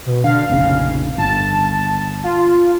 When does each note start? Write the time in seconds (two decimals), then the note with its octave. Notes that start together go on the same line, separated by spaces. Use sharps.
0.06 B2
0.24 D3 F5
0.50 F1 A#1 C#3
1.18 G1 A5
2.24 F4